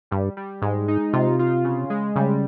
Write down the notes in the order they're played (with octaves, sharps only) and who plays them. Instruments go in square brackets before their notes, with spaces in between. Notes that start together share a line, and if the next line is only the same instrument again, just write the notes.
[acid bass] G2 [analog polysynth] G3
[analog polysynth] G3
[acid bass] G#2 [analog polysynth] G#3
[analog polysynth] D#4
[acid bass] C3 [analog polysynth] F4
[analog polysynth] F4
C#3
G#3
[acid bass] C#3 [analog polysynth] G3